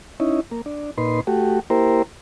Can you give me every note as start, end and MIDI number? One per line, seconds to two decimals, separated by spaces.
0.20 0.40 61
0.20 0.40 63
0.20 0.40 64
0.51 0.61 58
0.66 0.91 62
0.98 1.20 46
0.98 1.20 63
0.98 1.20 71
0.98 1.20 84
1.27 1.60 57
1.27 1.60 66
1.27 1.60 67
1.70 2.02 58
1.70 2.02 64
1.70 2.02 67
1.70 2.02 70
1.70 2.02 72